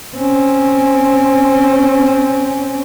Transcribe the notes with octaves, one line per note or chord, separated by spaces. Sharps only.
C4 C#4